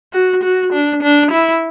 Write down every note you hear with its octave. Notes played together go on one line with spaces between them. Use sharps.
F#4
F#4
D4
D4
E4